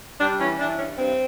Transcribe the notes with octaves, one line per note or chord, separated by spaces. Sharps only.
G3 D4
E3 C#4
E3 D4
G2 C#4
G2 C4